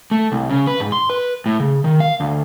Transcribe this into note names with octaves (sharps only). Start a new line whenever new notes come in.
A3
C2
C#3
B4
G#2
C6
B4
A2
C#3
D#3
F5
D2